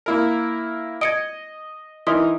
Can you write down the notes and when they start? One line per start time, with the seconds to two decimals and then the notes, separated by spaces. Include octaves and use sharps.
0.06 A#3 E4 A#4
1.01 D#5 G#6 C#7 D7
2.07 E3 D#4 A#4 E5 C6 D#6